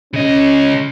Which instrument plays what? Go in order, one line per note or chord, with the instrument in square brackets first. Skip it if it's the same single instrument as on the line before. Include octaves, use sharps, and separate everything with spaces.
[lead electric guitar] C#3 D#5 [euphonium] C#4